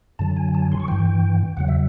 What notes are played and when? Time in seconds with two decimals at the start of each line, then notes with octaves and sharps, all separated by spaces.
0.19 F#2 D3 F#3 A5
0.37 G#5
0.55 A5
0.62 G#5
0.72 C6
0.80 C#6
0.88 G2 E3 G5
1.57 E2 C#3 F#3 F#5
1.68 E5